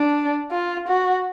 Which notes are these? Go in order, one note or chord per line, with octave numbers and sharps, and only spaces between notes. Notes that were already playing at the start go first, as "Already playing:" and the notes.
Already playing: D4
F4
F#4